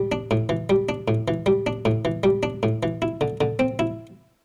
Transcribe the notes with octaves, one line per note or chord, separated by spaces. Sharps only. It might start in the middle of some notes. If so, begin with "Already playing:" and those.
Already playing: G3
D4
A2
E3
G3
D4
A2
E3
G3
D4
A2
E3
G3
D4
A2
E3
E4
D3
D3
C4
E4